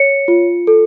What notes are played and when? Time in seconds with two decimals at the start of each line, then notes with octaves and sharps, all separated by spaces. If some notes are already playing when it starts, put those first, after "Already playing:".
Already playing: C#5 C#7
0.28 F4
0.67 A4